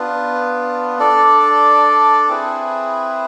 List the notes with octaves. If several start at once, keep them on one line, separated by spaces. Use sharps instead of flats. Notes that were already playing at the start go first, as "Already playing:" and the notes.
Already playing: B3 D4 F4 B4
D4 A4 D5
C4 E4 G#4 B4